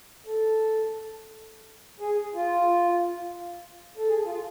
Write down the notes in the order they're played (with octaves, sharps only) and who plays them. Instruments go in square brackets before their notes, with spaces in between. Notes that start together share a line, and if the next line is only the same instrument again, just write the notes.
[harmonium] A4
G#4
F4
A4
G#4
F4